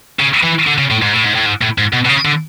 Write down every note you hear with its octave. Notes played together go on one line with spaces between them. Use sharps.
C#3
E3
D3
C#3
A2
G#2
A2
G#2
A2
G#2
A2
G#2
B2
B2
C#3
D3